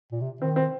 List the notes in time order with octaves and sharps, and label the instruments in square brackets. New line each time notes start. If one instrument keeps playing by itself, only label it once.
[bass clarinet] A#2
C3
[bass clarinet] D#3 [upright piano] C4
[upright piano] C4